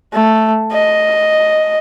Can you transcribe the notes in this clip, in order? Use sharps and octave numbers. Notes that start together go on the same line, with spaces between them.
A3
D#5